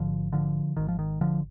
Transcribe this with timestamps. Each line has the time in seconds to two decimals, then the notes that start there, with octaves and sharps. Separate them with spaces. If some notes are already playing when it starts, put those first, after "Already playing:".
Already playing: G#1 G#2 D3 F3
0.32 D3 F3
0.77 G#1 G#2 D#3
0.88 F3
0.99 D#3
1.21 D3 F3